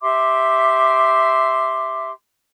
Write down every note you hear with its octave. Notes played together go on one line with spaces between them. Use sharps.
G4 E5 C6 D6